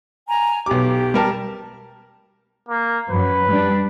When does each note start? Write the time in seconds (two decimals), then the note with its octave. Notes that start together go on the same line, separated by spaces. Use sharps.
0.27 G#5 A#5
0.66 B1 G4 D6
1.14 G3 A#4 A5
2.69 A#3
3.10 F#2 F#3 B4
3.48 G3 D4